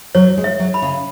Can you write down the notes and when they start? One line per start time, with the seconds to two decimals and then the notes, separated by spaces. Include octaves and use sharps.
0.15 F#3 C#5
0.38 G#3
0.44 E5
0.59 F#3
0.74 B5
0.82 C#3